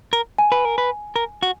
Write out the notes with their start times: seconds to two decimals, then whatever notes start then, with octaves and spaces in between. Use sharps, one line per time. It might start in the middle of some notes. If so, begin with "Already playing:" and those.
0.13 A#4
0.38 G#5
0.52 B4
0.65 A#4
0.78 B4
1.16 A#4
1.43 F#4